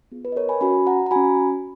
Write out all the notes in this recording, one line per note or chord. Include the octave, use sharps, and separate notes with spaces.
B3 F4 G#4
B4
D#5
A#4 C#5
G#5 B5
C#4 F#4 G#5 B5
F#5 A#5
A#5
C#4 F#4 G#5 B5